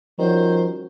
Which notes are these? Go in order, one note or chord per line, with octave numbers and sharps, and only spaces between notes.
D#3 F3 G3 C#4 F#4 C5